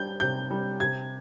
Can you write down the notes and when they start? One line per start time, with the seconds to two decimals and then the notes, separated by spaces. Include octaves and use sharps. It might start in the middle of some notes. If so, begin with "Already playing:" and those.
Already playing: G3 G6
0.20 C3 G6
0.51 G3
0.80 C3 G#6